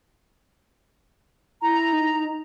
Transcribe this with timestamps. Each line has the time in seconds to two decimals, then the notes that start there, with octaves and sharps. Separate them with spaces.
1.62 E4 A#5
1.93 D#4